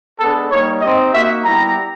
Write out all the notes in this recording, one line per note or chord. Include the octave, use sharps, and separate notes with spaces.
G#3 B3 D4 A4
G3 A#3 D#4 C#5
C4 D#4 G4 D#5
A#3 D#4 F#4 E5
G3 B3 E4 G4 A#5